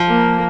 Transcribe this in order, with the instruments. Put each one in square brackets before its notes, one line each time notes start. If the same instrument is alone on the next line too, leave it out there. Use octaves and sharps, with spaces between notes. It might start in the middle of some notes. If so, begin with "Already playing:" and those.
Already playing: [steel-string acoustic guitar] F3
[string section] A#3